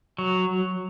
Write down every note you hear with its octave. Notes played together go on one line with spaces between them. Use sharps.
F#3